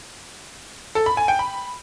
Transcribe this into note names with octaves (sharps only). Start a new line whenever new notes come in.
A4
B5
G#5
G5
B5